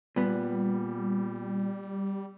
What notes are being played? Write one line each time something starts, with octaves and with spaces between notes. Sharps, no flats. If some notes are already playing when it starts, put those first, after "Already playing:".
A#2 G3 B3